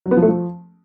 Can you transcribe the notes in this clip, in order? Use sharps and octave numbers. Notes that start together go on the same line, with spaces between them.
F#3
B3
F3
A3
F3